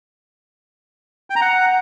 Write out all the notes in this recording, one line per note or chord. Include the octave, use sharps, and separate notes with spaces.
G5
A#5
F#5